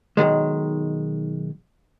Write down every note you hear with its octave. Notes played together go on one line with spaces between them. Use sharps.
B1 F#2 D#3 G#3